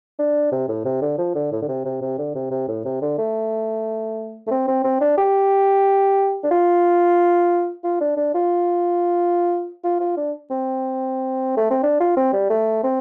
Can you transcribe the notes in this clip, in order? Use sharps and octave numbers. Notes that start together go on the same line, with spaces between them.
D4
C3
A2
C3
D3
F3
D3
A2
D3
C3
C3
C3
D3
C3
C3
A2
C3
D3
A3
A3
C4
C4
C4
D4
G4
D4
F4
F4
D4
D4
F4
F4
F4
D4
C4
A3
C4
D4
F4
C4
G3
A3
C4